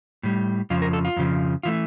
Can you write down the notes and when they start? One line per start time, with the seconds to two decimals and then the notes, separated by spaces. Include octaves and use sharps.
0.23 A2 G3
0.70 F2 C#3 F3 F4
0.82 A#4
0.93 A4
1.05 F4
1.16 F2 C#3 F3
1.63 E3 A3 F4